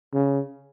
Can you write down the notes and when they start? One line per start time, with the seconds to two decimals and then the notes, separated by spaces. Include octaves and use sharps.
0.14 C#3